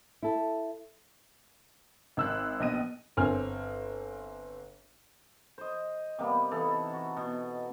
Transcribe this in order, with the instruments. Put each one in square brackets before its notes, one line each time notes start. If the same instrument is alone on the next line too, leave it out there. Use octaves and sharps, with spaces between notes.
[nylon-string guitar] E4 A4
[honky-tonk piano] G#1 E6 F#6
A#1 B2 D#5 D#7
[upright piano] G1 C4 G#5 F6
[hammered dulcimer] C5 D#5
C3 G3 A#3 B3
E3 D#4 A4
F#4
B2